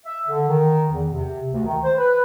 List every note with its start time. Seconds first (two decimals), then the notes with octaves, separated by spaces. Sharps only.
0.06 E5
0.27 D3
0.49 D#3
0.91 E2
1.13 C3
1.53 D2
1.65 D#3
1.84 C5
1.98 B4